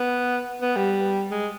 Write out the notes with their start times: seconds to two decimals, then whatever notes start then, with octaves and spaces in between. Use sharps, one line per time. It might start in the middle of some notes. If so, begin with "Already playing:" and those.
Already playing: B3
0.62 B3
0.76 G3
1.31 G#3